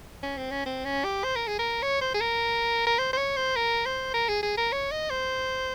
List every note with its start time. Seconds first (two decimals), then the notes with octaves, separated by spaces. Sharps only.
0.23 C#4
0.37 C4
0.51 C#4
0.66 C4
0.85 C#4
1.04 G4
1.24 C5
1.35 A#4
1.47 G#4
1.59 A#4
1.82 C#5
2.01 C5
2.14 G#4
2.21 A#4
2.87 A#4
2.98 C5
3.13 C5
3.18 C#5
3.37 C5
3.56 A#4
3.85 C5
4.14 A#4
4.29 G#4
4.43 G#4
4.57 A#4
4.72 C#5
4.91 D#5
5.10 C5